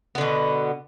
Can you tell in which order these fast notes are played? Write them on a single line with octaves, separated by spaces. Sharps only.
B3 D3 B2